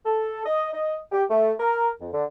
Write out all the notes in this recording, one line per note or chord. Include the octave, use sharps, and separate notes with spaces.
A4
D#5
D#5
G4
A3
A#4
F2
D3